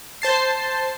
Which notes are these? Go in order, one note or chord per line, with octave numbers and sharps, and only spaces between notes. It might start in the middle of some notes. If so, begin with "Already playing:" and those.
C5 A5 C7